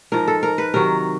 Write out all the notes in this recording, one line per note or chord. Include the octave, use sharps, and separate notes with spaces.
G#2 F3 A#4
A4
A#4
B4
C3 D#3 F#3 A#4